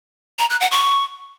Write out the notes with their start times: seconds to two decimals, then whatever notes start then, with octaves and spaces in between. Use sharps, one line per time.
0.39 A#5
0.50 F#6
0.61 F#5
0.71 C#6